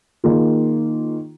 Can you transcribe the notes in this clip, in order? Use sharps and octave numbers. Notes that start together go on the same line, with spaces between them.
D#3 A#3 F4 G#4